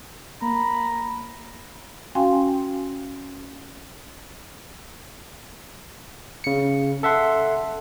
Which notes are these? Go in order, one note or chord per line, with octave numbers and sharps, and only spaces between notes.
A#3 A#5 B5
C#4 F#4 F5 G5 G#5 C6
C#3 C#7
A4 E5 F#5 C6